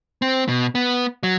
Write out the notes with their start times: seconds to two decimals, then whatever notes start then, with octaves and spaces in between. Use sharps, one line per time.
0.22 C4
0.48 B2
0.75 B3
1.23 F#3